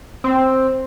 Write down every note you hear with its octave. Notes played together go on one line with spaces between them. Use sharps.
C4